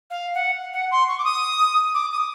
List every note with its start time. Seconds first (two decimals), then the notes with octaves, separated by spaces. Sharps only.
0.10 F5
0.34 F#5
0.73 F#5
0.91 C6
1.08 C#6
1.18 D6
1.24 D#6
1.94 D6
2.11 D#6